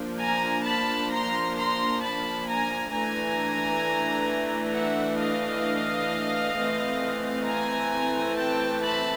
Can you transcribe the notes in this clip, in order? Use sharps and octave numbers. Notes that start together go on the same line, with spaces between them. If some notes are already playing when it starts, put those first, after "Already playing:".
Already playing: F3 A#3 D4
G#5 A#5
A5 B5
A#5 C6
A#5 C6
A5 B5
G#5 A#5
E3 A3 D4 G#5 A#5
E5 F#5
D#5 F5
E3 A3 C4
G#5 A#5
G5 A5
A5 B5